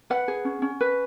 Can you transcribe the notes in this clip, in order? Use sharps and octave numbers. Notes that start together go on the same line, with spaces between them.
B4 F#5
G#4
C#4
C#4
B4